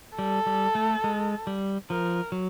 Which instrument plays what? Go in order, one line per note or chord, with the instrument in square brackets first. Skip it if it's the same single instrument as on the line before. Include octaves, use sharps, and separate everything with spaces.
[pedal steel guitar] G3 [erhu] A4
[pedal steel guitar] G3
A3
G#3
G3
[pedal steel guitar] F3 [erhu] A#4
[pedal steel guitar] F#3